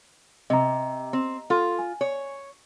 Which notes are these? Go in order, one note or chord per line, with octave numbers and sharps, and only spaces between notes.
C3 D#5 A#5
C4
F4 A4 C6
G#5
C#5